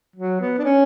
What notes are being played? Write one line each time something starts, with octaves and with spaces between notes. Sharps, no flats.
F#3
B3
D4
C#4